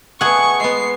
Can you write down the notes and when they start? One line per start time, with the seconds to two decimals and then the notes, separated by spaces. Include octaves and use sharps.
0.21 A3 B3 G#4 F#5 C#6
0.60 G#3 B3 C7